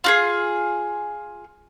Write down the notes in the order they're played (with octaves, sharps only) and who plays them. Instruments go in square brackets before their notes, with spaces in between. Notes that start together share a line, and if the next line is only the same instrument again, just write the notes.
[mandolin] F4 F#4 G#4